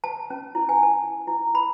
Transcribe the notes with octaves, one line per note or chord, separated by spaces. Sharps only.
A5
C#4
E4
G#5
A5
E4
B5